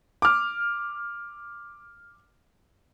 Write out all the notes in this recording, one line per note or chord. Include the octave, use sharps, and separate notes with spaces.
D6 F6